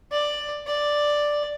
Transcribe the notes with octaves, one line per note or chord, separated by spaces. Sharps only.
D5
D5